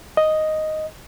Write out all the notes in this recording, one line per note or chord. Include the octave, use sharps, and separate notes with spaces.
D#5